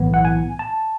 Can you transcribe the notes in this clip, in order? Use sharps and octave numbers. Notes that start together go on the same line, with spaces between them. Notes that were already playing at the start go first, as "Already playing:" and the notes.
Already playing: B1 A2 E3 B3
F#5
G#5
A5